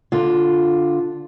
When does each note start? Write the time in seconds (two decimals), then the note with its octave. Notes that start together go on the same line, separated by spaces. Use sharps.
0.12 D3 F4